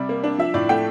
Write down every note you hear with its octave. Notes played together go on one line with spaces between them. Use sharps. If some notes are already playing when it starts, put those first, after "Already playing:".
Already playing: C3 G3 D5
A#3
D4
F3 E5
A2 D5
A3 G5